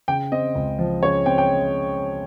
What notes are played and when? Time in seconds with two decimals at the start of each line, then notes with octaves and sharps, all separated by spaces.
0.08 C#3 G5
0.32 C4 D#5
0.55 C#2
0.79 F3
1.02 C#3 C#5
1.26 C4 G5
1.38 G5